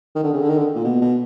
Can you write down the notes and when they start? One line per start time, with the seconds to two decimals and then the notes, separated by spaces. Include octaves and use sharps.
0.15 D#3
0.24 D3
0.33 C#3
0.42 D3
0.49 D#3
0.58 D3
0.75 A#2
0.84 B2
1.01 B2